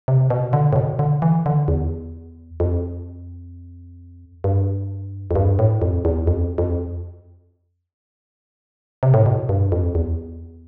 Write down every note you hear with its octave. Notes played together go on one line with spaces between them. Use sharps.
C3
B2
D3
A2
B2
D3
E3
D3
E2
F2
G2
F2
G2
A2
F2
E2
F2
F2
C3
A2
B2
G2
F2
E2